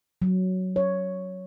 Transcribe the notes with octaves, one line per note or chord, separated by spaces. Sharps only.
F#3
C#5